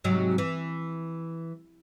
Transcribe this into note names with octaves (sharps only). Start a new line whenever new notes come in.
G#2 C3 F#3
E3